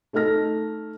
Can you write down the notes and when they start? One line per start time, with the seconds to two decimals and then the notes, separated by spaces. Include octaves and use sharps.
0.13 A3 D#4 A4 F6 A#6